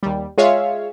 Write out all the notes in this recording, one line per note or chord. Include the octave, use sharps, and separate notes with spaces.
D#2 G3
G#3 F4 G#4 C#5 E5 F5